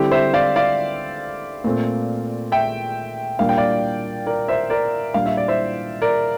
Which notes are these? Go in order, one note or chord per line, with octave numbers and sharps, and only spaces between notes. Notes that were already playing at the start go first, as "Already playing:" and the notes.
Already playing: D3 G3 C4 E4 G4
C5 E5
D5 F5
D5 F5
A#2 A3 C4
E5 G5
A#2 G3 A#3 D4 F5
G5
D5 F5
A#4 D5
C5 E5
A#4 D5
A#2 G3 D4 F5
E5
D5
C5 E5
A#4 D5